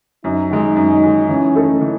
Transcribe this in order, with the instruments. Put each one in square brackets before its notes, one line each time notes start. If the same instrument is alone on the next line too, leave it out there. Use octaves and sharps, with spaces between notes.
[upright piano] F#2 [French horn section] D#4
[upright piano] D#3 G#3
F#2
D#3 G#3
[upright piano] E3 [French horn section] C#4
[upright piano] A3 D#4 A4
E3